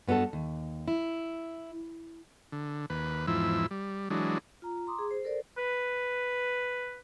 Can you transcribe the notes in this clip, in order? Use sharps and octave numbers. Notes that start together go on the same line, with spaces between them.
G2 B3 F#4 A4 A5
D#2
E4
D3
D#2 B4
E2 G#2 F3 E4 E6
G3
E3 F#3 G#3 D4
F4 A#5
A#5 C6 D6 D#6
G#4
C5
A4 A#4 C5 D5
B4